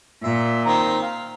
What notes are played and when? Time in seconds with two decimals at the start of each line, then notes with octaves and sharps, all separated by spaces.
0.24 A#2 E5
0.65 D#3 C4 A#5
1.02 F5